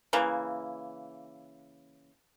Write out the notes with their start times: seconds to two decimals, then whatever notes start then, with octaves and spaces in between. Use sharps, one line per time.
0.13 C#3 E3 A#3